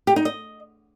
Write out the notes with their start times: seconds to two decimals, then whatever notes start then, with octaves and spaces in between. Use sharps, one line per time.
0.07 G4
0.16 D#4
0.25 D#5